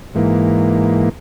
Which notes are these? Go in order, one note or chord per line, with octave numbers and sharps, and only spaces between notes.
G#2 E3 A#3